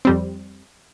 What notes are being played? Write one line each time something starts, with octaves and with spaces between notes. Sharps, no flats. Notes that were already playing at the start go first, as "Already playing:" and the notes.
F2 G3 C4